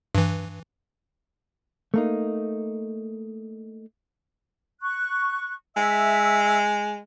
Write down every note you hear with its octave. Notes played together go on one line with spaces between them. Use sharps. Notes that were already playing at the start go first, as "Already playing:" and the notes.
G2 E3
A3 A#3 D#4
C#6 F#6
G#3 E5 E6